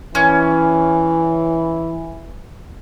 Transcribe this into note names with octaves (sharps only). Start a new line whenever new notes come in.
E3 C#4